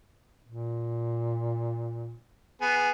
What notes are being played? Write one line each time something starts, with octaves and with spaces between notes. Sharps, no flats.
A#2
B3 G#4